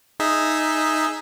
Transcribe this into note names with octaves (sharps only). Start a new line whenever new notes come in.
D#4 G#4 E5